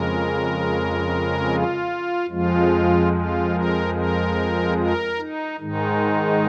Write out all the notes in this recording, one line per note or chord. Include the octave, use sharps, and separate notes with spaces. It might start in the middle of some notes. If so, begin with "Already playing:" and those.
Already playing: F2 C#3 G#3 A#4
F4
F2 F3 G#3 F4
F4
A#4
A#4
A#4
D#4
G#2 D#3 G#3 D#4